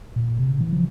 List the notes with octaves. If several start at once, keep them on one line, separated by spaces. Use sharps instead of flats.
A#2
C3
C#3
E3
F3